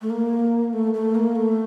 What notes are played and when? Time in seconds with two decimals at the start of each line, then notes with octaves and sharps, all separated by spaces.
0.02 A3
0.10 A#3
0.73 A3
0.94 A3
1.15 A#3
1.36 A3